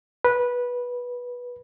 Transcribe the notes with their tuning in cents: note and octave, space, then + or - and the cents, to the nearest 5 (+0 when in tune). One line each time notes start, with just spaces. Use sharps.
B4 -15